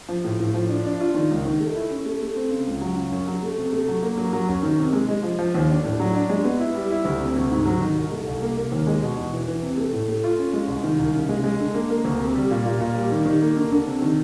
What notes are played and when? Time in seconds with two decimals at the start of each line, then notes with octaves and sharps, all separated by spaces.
0.08 F3
0.24 A2
0.40 A2
0.54 F3
0.69 D4
0.85 D4
1.00 F4
1.14 D#3
1.30 C#2
1.45 D#3
1.60 A3
1.75 E4
1.90 C#4
2.05 A3
2.22 A3
2.36 C4
2.51 C#3
2.67 C#2
2.81 F#3
2.96 C#3
3.11 F#2
3.27 F#3
3.42 A3
3.57 C3
3.72 A3
3.88 F#3
4.02 A#3
4.17 F#3
4.33 F#3
4.49 F#2
4.63 D#3
4.79 C3
4.93 G#3
5.08 G#3
5.23 F3
5.39 F3
5.55 D#2
5.70 D4
5.84 A2
5.99 F#3
6.15 D4
6.29 G#3
6.44 B3
6.59 E4
6.75 G3
6.90 E4
7.05 D2
7.20 C3
7.36 D2
7.51 G#2
7.65 F#3
7.81 D#3
7.96 C2
8.11 A3
8.27 C2
8.42 A#3
8.57 A#3
8.72 D#2
8.87 G#3
9.02 B2
9.17 E2
9.33 E3
9.48 E3
9.62 C3
9.77 A3
9.92 A2
10.08 A3
10.24 F4
10.39 C#4
10.53 G#3
10.68 C2
10.83 D#3
10.99 C2
11.15 C#3
11.29 G#3
11.44 G#3
11.60 D3
11.74 A#3
11.90 A#3
12.04 D2
12.19 C3
12.35 G3
12.51 A#2
12.65 A#2
12.80 A#2
12.96 G3
13.11 D#3
13.25 D#3
13.41 A#3
13.57 D3
13.72 D3
13.86 C3
14.02 D#3